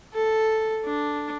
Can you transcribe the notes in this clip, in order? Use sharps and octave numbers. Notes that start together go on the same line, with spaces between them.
A4
D4